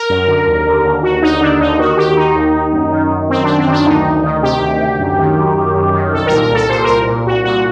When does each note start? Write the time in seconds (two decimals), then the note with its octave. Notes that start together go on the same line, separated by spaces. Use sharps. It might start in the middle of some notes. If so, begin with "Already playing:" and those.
Already playing: A#4
0.09 F#2
0.28 D3
0.47 D#2
0.66 D3
0.85 D#2
1.03 D3 F#4
1.22 D#2 D#4
1.41 D3 D4
1.60 D#2 D#4
1.79 D#3 F#4
1.97 D#2 G4
2.16 D#3 D#4
2.36 D#2
2.55 D#3
2.73 F#2
2.92 D#3
3.11 F#2
3.30 D#3 C4
3.44 F#2 D4
3.59 C4
3.68 D#3 D4
3.86 D2 D#4
4.05 D2
4.24 D#3
4.43 C3 G4
4.61 D2
4.81 D2
4.99 F#2
5.18 D#3
5.38 F#2
5.56 D#3
5.75 F#2
5.94 D#3
6.13 C2 A4
6.27 A#2 A#4
6.41 A#4
6.50 C2 A4
6.69 A#2 C5
6.84 C2 A#4
7.07 A#2
7.26 C2 F#4
7.45 A#2 F#4